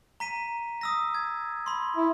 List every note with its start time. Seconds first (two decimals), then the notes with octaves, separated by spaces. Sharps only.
0.20 A#5 B6 D#7
0.81 D#6 E6 A#6
1.14 G#6
1.66 B5 C6
1.97 E4